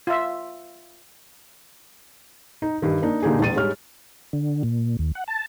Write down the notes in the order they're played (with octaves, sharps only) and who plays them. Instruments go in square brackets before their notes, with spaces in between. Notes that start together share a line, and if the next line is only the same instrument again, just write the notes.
[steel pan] F4 E5
[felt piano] D#4
G2 D#3
A#3 D4 D#4
A#2 D3 D#4 G4 G#4
E1 A#1 A6 D#7
G#2 G3 G#3 C#5 F6
[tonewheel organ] D3
A#2
D#2
F#5
A5